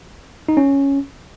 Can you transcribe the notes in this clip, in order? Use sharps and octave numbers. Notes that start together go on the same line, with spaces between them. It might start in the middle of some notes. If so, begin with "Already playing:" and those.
D#4
C#4